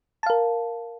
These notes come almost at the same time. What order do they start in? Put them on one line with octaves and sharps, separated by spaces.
A5 F5 A#4